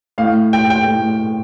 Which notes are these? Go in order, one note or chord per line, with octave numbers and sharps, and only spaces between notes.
A2 F5
G5
G5
A2